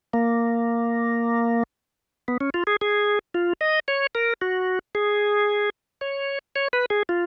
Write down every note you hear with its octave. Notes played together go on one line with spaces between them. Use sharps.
A#3
B3
C#4
F4
G#4
G#4
F4
D#5
C#5
A#4
F#4
G#4
C#5
C#5
B4
G#4
F4